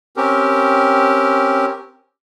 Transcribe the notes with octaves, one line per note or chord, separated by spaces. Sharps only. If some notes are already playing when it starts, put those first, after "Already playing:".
C4 C#4 G4 A#4